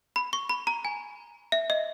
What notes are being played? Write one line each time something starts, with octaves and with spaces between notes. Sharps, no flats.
B5
C#6
B5
A#5
G#5
E5
D#5